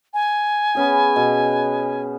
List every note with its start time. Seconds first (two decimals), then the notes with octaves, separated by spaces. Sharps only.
0.14 G#5
0.75 B3 C#4 G#4
1.16 B2